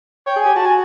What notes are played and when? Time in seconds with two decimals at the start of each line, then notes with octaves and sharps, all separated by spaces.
0.26 C#5 G5
0.36 G#4
0.41 G4 G#5
0.56 F#4 A5
0.65 G#5